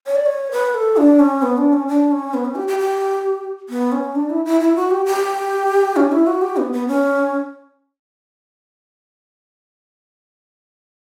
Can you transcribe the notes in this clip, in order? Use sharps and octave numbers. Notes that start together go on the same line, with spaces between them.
C#5
D5
C#5
B4
A4
D4
C#4
B3
D4
C#4
D4
C#4
B3
C#4
G4
G4
G4
B3
C#4
D4
E4
E4
E4
F#4
G4
G4
C#4
E4
F#4
G4
B3
B3
C#4